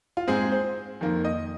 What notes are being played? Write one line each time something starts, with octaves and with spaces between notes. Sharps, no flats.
F4
G#2 G#3 C4 G#4
C5
F2 D#3 A#3
D#5